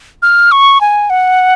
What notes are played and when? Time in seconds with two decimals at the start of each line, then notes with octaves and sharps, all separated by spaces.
0.22 F6
0.52 C#6
0.81 G#5
1.10 F#5